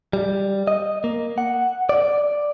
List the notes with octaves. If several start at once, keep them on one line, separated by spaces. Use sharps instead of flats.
G3
D#5
A#3
F#5
D5